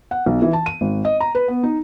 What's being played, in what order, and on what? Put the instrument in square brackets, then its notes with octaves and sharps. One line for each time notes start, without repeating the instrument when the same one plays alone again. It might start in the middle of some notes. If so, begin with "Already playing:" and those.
[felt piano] F#5
B1
E3
A5
D#7
G#1
D#5
A#5
B4
B3
D#4